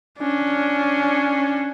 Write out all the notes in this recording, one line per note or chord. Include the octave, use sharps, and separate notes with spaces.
C#4 D4